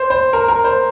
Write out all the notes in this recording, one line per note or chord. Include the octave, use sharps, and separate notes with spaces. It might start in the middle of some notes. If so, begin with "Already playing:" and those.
Already playing: C5
C5
A#4
A#4
C5